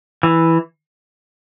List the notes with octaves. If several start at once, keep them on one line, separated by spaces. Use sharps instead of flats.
E3